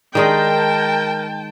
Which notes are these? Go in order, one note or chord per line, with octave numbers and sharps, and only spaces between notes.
D#3 G#3 D#4 A#4 G5 A5